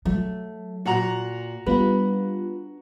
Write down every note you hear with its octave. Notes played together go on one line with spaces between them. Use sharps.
F#3 A3
A#2 F#4 F#5 A#5
G3 B3 D4 F4 B4